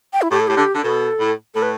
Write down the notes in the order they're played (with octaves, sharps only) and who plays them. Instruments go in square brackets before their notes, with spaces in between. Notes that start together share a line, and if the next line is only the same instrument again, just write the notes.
[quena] G5
E4
[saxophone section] A2 [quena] G4
[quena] A4
[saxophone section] A2 [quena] G4
[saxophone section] D3
D3
[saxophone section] B2 [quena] A4
[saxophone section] A2
[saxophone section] A2 [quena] A4
[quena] B4